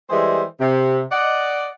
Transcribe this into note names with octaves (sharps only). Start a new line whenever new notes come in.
E3 G3 G#3 G#4 A4 C5
C3
D5 D#5 F#5